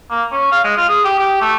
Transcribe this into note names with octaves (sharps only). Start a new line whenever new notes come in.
A#3
C#4
F5
G#3
F4
G#4
G4
G4
A3